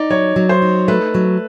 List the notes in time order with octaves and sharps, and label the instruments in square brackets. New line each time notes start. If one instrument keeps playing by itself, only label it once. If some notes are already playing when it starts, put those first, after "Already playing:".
Already playing: [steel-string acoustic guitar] D#4 [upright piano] D5
[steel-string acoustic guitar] F#3 [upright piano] C#5
[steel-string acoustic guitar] F#3
[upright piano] C5
[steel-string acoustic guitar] D#4
[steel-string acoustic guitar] A3 [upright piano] B4
[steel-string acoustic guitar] F#3